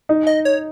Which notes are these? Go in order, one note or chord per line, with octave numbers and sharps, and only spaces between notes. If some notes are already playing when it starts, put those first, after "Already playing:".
D#4
D#5
C#5